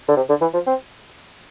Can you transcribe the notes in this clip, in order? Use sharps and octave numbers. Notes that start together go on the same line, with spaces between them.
D3
C3
D3
E3
F3
C4